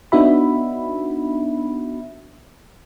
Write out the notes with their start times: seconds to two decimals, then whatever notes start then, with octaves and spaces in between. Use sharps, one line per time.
0.12 B3 D4 D#4 F#4 E5 B5